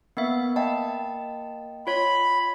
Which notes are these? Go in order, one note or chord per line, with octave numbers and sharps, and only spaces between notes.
A#3 B3 E5
A#3 D#5 G5 A5
F4 C#5 B5